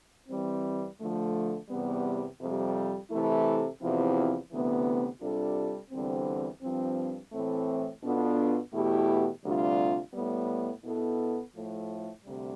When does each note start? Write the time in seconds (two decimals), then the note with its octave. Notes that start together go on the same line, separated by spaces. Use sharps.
0.29 E3 G3 C4
0.99 D3 F3 A3
1.69 E2 C3 G3 B3
2.40 F2 C3 G3
3.10 C3 E3 A3 E4 A4
3.80 E2 C3 F3 C4 E4
4.51 D2 C3 E3 B3
5.20 C3 G3 D4 F4 A4
5.91 E2 D3 G3 C4
6.61 G2 F3 C4
7.32 A2 E3 A3 C4
8.01 B2 B3 D4 F4 A4
8.72 E2 B2 A3 E4 G4
9.42 D2 C3 G3 D4 F4
10.13 A2 G3 B3
10.83 B2 B3 E4 A4
11.54 A2 F3 A3
12.23 D2 C3 G3